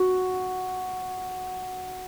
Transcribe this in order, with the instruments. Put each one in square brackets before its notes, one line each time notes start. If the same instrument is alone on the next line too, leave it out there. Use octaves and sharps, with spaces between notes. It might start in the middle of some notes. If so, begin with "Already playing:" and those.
Already playing: [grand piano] F#4